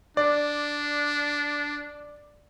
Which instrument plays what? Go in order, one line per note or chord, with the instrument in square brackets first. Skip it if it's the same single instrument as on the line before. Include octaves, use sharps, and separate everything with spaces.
[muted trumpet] D4 [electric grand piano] D5